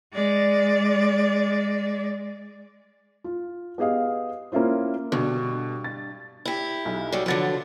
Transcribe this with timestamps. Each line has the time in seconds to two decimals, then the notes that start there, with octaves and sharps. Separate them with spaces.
0.13 G#3 D5
3.24 F4
3.78 B3 G4 G#4 D#5 F5
4.52 A#3 C#4 E4 F4 C5
5.12 G2 B2 D3
5.84 A6
6.45 E4 G4
6.85 B1
7.12 F#3 G3
7.26 D3 F3 F#3 B4 A6